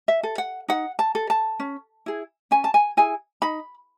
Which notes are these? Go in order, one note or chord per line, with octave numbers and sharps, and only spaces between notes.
E5
A4
F#5
D#4 F#5
A5
A4
A5
C#4
E4 G#4
C#4 G#5
A5
G#5
E4 G#4 G#5
D#4 B5